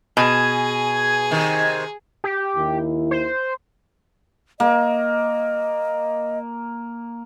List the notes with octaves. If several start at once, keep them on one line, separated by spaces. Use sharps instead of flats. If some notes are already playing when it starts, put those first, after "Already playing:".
B2 G#4 G#5
C3 D#3
G4
D#2 D#3 E4
C5
A#3 D#5